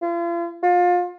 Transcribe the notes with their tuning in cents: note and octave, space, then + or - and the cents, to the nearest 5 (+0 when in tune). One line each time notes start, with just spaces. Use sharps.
F4 -40
F4 +25